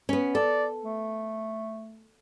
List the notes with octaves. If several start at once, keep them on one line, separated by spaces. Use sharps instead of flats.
B3 C#4
A4 D5
A3